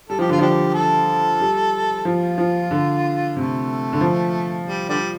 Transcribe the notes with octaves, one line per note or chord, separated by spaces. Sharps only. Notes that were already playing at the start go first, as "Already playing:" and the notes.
G3 A4
F3 G4
D3 F4
F3 D4 G4
A4
G3
F3 F4
F3
D3
C3 A3
D3
F3
G3
D3 G3